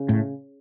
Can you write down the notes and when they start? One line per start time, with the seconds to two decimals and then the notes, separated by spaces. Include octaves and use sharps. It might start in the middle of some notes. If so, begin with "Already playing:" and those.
Already playing: C#3
0.09 A2